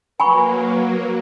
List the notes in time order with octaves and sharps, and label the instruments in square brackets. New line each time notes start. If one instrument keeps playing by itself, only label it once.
[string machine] F#3 A#3 [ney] B4 [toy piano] G#5 B5 C#6